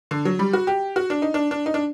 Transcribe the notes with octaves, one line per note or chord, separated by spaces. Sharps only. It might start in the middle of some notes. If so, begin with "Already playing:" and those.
D3
F#3
G3
F#4
G4
F#4
D4
D#4
D4
D4
D#4
D4